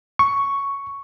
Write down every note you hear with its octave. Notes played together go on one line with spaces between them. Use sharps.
C#6